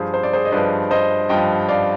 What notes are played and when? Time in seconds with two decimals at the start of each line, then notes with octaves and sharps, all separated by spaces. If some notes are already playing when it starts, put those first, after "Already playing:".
Already playing: G2 F3 G#4 C5
0.14 C5
0.23 D5
0.33 G#4 C5
0.45 D#5
0.52 G2 F3 B4 D5
0.91 C5 D#5
1.29 G2 F3 D#5 G5
1.68 D5 F5